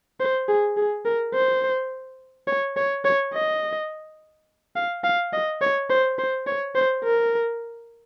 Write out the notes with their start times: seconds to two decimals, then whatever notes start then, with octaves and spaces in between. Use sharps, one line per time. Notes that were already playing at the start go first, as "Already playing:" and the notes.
0.20 C5
0.49 G#4
0.77 G#4
1.05 A#4
1.34 C5
2.48 C#5
2.77 C#5
3.05 C#5
3.34 D#5
4.76 F5
5.04 F5
5.33 D#5
5.61 C#5
5.90 C5
6.19 C5
6.47 C#5
6.75 C5
7.04 A#4